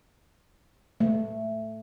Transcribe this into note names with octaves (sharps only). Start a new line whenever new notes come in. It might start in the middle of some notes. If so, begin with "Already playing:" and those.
A3